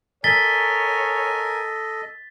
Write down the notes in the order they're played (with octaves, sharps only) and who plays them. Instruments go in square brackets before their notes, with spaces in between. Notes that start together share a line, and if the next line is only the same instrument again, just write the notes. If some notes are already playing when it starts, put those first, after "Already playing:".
[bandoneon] A4 D#5 [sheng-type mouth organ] A#4 G#5 [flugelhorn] C#5 [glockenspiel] A6 B6 G7